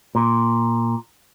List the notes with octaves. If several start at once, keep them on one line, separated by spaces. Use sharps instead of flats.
A#2